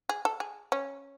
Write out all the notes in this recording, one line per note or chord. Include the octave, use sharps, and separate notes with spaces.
G#4
A4
G#4
C#4